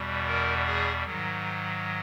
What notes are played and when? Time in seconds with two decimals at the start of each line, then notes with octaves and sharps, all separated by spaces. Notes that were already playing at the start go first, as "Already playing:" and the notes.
Already playing: E2 B2 G3
0.27 A#4
0.66 G#4
1.04 G#2 D#3 F#3